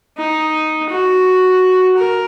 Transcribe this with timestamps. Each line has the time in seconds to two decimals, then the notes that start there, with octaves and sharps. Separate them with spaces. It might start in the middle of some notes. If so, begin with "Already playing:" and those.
0.17 D#4
0.90 F#4
1.97 A#4